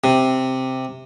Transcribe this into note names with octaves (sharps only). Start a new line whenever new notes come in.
C3